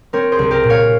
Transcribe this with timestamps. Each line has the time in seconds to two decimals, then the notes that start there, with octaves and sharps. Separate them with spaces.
0.13 C4 A#4 C#5
0.32 G#4 C5
0.39 C2
0.51 G4 A#4
0.63 A#2
0.70 C#5 F5